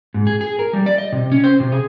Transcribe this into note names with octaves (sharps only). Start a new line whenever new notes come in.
G#2
G#4
G#4
A#4
G3
D5
D#5
C3
C#4
C5
C3
G#4